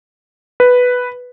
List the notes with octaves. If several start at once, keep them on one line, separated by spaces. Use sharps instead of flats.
B4